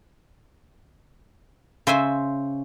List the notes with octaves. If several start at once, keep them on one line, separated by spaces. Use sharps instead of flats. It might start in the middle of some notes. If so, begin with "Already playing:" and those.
C#3 C5 E5 G#5